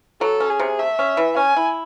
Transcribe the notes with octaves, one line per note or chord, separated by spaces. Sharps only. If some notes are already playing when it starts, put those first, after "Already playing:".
F#3 A4
C#4
G#4
C3
A3 E5
C#4
E3
C#4 G#5
E4